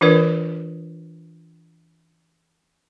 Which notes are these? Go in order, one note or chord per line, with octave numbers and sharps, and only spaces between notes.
E3 D4 F4 A#4 B4 D5